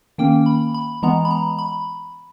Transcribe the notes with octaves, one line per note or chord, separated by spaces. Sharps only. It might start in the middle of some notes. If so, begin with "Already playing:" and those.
D#3 A#3 C#4 G5
B5
B5
E3 G#3 B3 A#5
B5
A#5
B5